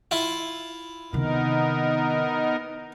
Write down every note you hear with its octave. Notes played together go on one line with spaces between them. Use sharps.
E4 F4
C3 D#3 B3 D#4 A#4